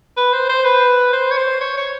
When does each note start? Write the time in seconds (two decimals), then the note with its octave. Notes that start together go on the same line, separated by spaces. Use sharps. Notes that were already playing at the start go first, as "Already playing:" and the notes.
0.17 B4
0.33 C5
0.49 C5
0.65 B4
1.13 C5
1.31 C#5
1.37 C5
1.61 C#5
1.77 C#5